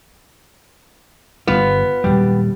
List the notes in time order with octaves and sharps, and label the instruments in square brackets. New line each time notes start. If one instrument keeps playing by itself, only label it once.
[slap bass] G1 G3 [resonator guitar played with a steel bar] B3 [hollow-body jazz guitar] F4
[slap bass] D#1 C#2 F#3 [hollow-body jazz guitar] G2 G3